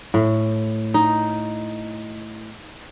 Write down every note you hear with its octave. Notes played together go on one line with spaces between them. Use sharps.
A2
D#4